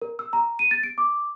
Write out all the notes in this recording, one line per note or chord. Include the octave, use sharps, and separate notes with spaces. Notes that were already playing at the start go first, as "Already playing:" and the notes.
A#4
E6
A#5
D#7
A6
D7
D6